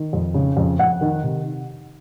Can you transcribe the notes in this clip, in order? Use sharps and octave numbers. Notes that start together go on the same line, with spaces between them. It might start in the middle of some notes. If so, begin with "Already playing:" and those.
Already playing: D#3
F2
C#3
F2
F2 F#5
D#3
C3